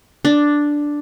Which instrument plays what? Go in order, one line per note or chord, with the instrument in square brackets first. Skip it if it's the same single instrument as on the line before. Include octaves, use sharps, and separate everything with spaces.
[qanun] D4